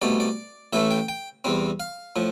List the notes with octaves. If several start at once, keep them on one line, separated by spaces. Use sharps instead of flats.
C2 B2 A3 D5
D5
A1 A2 E3 A3 E5
G5
G5
E2 C3 G3 C4
F5
A2 F3